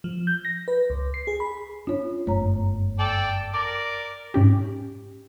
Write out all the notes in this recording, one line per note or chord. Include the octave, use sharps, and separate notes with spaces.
F3
G6
A#6
B4
C#2
C7
G#4
B5
C#4 D4 F4 C#5
G1 F#2 A3 C#5 A#5
A4 D5 G5
A#4 D5 D6
G#2 C#4 G4